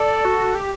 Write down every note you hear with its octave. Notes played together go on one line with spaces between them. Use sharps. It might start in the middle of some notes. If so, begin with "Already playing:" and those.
Already playing: A4 D5
F#4
G4